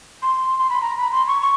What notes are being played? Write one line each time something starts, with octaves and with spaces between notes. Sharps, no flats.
C6
C6
B5
A#5
B5
C6
C#6
C#6